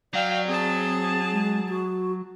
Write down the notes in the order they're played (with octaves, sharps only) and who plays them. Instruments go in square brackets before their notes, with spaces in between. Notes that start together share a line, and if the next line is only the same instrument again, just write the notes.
[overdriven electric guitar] F#3 [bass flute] D5 [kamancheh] F5 G5
[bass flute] C4 [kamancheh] G#4 A5
[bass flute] G#3
F#4